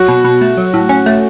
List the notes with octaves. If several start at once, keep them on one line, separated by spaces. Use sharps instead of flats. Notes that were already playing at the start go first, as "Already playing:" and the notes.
Already playing: F#3 F#4
B2
B2
A3
F#3
A2
C#4
A3